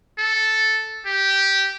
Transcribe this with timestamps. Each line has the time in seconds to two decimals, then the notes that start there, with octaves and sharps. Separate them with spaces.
0.19 A4
1.07 G4